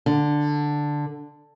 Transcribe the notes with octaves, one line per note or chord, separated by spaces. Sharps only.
D3